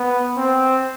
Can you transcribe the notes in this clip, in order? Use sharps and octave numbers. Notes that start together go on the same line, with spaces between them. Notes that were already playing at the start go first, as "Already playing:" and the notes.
Already playing: B3
C4